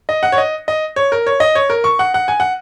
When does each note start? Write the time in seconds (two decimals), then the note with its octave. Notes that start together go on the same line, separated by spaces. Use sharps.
0.09 D#5
0.23 F#5
0.32 C#5
0.38 D#5
0.68 D#5
0.96 C#5
1.12 A#4
1.27 C#5
1.40 D#5
1.55 C#5
1.70 A#4
1.84 C#6
1.99 F#5
2.14 F#5
2.28 G#5
2.40 F#5